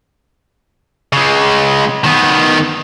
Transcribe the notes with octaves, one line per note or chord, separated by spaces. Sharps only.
C#3 G#3
D#3 B3